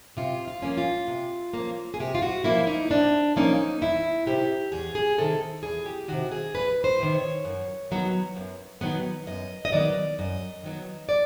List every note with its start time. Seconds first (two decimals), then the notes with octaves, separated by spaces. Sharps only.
0.17 C3 F4
0.48 F4
0.62 F3 A#3 C#4
0.78 F4
1.08 C3
1.53 F3 A#3 C#4
1.94 G#4
2.00 C3 G4
2.15 F4
2.22 F#4
2.44 F3 A#3 C#4 E4
2.67 D#4
2.90 C3 D4
3.36 F3 A#3 C#4 D#4
3.81 E2 E4
4.26 C3 D#3 G4
4.72 E2 G#4
4.95 G#4
5.18 C3 D#3 A4
5.63 E2 G#4
5.86 G4
6.08 C3 D#3 F#4
6.31 G#4
6.54 E2 B4
6.84 C5
6.99 C3 D#3
7.14 C#5
7.45 F#2
7.91 D#3 F#3 B3
8.36 F#2
8.81 D#3 F#3 B3
9.27 F#2 D#5
9.65 D#5
9.72 D#3 F#3 B3 D5
10.19 F#2 D#5
10.63 D#3 F#3 B3
11.09 D5